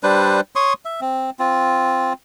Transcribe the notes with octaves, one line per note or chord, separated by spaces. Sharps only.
G3 D4 B4 C5
C#5 C6 C#6 D#6
E5
C4
C4 F4